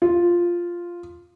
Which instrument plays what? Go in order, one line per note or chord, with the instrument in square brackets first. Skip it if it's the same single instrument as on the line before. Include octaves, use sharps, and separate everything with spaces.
[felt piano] F4